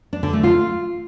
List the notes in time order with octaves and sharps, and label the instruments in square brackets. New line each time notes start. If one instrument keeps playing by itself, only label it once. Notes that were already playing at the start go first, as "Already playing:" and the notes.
[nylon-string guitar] D4
D3
A3
F4